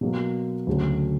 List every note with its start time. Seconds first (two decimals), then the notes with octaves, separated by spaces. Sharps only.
0.01 B2 F#3 A#3
0.67 D2 C#3 F#3 A3 C#4